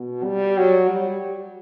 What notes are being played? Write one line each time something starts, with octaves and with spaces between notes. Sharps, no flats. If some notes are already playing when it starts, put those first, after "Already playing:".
Already playing: B2
G3
F#3
G3